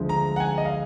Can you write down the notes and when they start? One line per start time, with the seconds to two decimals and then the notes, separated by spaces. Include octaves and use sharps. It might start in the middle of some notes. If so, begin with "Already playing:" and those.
Already playing: D2 D3 F3 G#3
0.09 A#5
0.36 F#5
0.40 G#5
0.58 D#5
0.65 F5